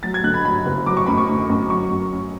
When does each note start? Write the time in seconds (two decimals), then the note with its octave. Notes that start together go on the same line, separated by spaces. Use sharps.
0.03 F#3 A6
0.14 G#6
0.24 D3 F#6
0.34 B5
0.45 F#3 B5
0.66 F#1
0.86 F#3 D6
0.97 C#6
1.06 F#2 B5
1.18 C#6
1.29 D3
1.49 F#2
1.70 F#3 C#6
1.90 F#2
2.12 C#4